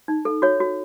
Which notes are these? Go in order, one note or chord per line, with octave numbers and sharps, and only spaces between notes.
D#4
A4
F#4 C#5
F#4